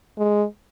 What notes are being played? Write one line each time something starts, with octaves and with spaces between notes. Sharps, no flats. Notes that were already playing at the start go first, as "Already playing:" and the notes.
G#3